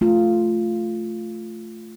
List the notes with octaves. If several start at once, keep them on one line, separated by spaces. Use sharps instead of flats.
A3 F4